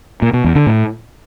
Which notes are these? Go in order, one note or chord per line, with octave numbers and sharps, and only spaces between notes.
A#2
B2
E2
D3
A2